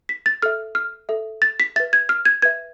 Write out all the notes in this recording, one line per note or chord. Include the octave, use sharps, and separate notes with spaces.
B6
A6
A4 E5 F6
F6
A4 E5
A6
B6
B4 E5 A6
G#6
F6
G#6
B4 E5 G#6